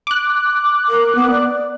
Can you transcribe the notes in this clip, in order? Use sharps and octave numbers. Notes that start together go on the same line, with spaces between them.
D6 F#6
A#4
B3
D5